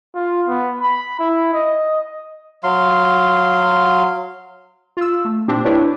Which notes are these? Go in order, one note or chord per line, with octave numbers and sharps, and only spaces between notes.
F4
B3
B5
E4
D#5
F#3 F5 C6
F4 E6
A3
A#2 C4 D4 G4
D4 E4 G4 B4 C#5